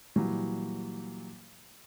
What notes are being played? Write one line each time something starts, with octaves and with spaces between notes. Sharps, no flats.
A#2 E3 F#3 G3